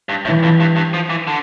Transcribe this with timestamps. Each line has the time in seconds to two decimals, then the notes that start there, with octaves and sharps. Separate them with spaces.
0.09 G2
0.25 A2 E3
0.43 F2
0.60 G2
0.76 G2
0.94 F3
1.10 E3
1.27 D3